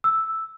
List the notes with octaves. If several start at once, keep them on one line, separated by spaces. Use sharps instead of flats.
E6